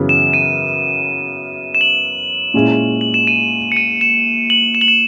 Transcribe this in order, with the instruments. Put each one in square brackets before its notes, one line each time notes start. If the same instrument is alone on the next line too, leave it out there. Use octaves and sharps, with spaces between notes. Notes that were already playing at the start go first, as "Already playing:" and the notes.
Already playing: [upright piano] F#2 C#3 E3 B3
[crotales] E7
D#7
E7
F#7
[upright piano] A#2 G#3 C#4 E4
[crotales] F#7
E7
D#7
C#7
D#7
E7
F#7
E7
F#7
E7